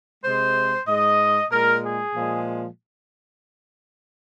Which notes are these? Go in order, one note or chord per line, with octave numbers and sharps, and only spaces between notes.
C3 G#3 C5
G#2 G#3 D#5
A#2 G#3 A#4
G#4
A#2 F3 G#3